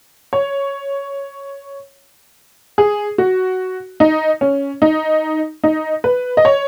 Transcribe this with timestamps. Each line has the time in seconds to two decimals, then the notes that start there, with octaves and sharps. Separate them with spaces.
0.33 C#5
2.78 G#4
3.18 F#4
4.00 D#4
4.41 C#4
4.82 D#4
5.64 D#4
6.04 B4
6.37 D#5
6.45 C#5